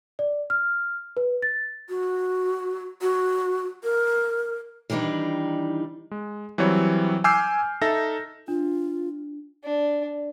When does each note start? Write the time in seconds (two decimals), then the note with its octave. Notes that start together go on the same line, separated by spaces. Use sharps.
0.19 D5
0.50 F6
1.17 B4
1.42 A6
1.89 F#4
3.01 F#4
3.83 A#4
4.90 D#3 E3 G3 D4 D#4
6.11 G#3
6.58 E3 F#3 G3 C4 C#5
7.24 G#5 D6 E6 F6 G6 C7
7.82 D#4 A4 E5 A#6
8.48 D4 F4
9.64 D4